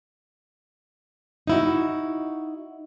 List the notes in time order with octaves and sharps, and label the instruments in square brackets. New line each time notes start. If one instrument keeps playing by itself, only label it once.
[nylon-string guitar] D#4 E4 F#4